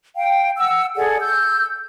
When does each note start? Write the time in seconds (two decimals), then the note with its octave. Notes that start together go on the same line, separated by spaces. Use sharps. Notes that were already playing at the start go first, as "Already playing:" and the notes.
0.16 F5 G5
0.57 F#5 E6
0.96 G#4 A4 D5 F#5
1.20 E6 G6